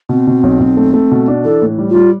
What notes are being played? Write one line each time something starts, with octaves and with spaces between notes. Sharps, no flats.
B2 C4
B2
B1
B1
A3
A3
B2
D4
E3 A4
A2
G3
F4
G3